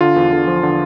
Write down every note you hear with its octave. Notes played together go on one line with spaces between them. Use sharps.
D3 F4
E2
D3
F3
D3